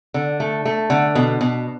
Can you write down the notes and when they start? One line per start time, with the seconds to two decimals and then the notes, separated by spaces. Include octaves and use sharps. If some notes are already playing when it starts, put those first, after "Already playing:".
0.14 D3
0.40 A3
0.65 A3
0.90 D3
1.15 B2
1.41 B2